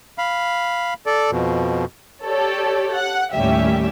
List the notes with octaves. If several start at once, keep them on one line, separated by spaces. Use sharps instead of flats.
F5 B5
A4 D5
F2 B2
G4 A4 C#5 D5
F#5
D#2 A2 G3 C#4 G4 E5